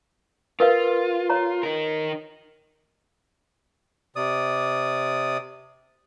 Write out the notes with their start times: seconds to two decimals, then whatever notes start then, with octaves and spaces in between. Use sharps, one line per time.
0.60 F4 A#4 B4 F5
1.30 C#5 A#5
1.63 D#4 A#4
4.16 C3 D5 D#6